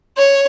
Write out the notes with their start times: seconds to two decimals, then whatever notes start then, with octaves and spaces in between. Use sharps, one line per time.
0.18 C#5